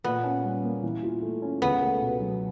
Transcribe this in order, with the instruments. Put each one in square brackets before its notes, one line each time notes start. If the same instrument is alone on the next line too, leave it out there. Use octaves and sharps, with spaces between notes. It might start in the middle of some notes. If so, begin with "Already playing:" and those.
[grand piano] A#2 [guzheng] B3
[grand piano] C#4
G3
A#3
E3
F4
A3
C#4
[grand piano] C#2 [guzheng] B3
[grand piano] A3
B2
F#3